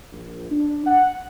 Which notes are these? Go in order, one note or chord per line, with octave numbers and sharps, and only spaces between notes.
A#1
D4
F#5